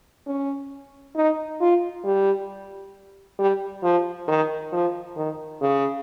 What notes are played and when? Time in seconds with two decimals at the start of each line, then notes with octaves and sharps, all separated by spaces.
0.27 C#4
1.16 D#4
1.61 F4
2.05 G3
3.39 G3
3.83 F3
4.28 D#3
4.72 F3
5.16 D#3
5.61 C#3